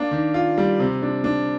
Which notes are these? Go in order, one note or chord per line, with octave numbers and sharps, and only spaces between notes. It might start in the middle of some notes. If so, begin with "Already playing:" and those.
Already playing: A#3 D4
D#3
F4
G3
C3
D4
D4